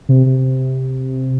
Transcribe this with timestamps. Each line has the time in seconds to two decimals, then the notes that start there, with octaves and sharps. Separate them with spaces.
0.09 C3
0.26 C3